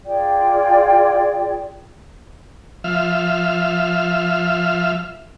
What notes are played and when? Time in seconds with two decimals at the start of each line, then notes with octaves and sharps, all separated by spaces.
0.05 F4 G#4 D5 G5
2.84 F3 E5 F6